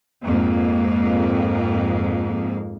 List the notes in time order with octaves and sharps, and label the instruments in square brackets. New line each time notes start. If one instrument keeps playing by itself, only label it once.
[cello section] F2 G#2 A#3